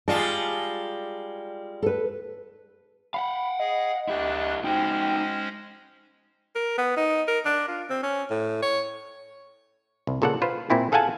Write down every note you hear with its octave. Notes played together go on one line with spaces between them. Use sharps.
G3 G#3 F4 A5
A4 B4
F5 F#5 B5
G#4 D#5
D2 D4 E4 G4 F#6
G#3 C#4 D#4 F#4 C5 G5
A#4
B3
D#4
A#4
D4
F4
C4
C#4
A2
C#5
C2
A#2 C#3 A4 D5 F#5
F4 B4 C5 F5
A#2 C4 E4 G#5
G#4 A4 F5 F#5 G#5 A5